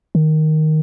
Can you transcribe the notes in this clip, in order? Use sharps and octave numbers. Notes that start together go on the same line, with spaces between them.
D#3